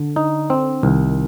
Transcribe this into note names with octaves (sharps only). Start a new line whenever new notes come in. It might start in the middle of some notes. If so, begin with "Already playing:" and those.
Already playing: D3
D#4
C4
C2 D#3